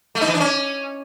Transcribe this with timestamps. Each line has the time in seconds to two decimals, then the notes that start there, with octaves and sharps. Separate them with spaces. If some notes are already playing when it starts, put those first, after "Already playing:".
0.15 A3
0.21 D#4
0.28 E3
0.34 D4
0.40 C#4